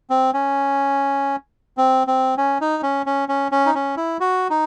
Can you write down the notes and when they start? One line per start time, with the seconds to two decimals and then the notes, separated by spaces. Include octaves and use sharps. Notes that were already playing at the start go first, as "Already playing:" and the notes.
0.10 C4
0.33 C#4
1.77 C4
2.07 C4
2.38 C#4
2.61 D#4
2.83 C#4
3.06 C#4
3.29 C#4
3.52 C#4
3.66 D#4
3.75 C#4
3.97 E4
4.20 F#4
4.50 D#4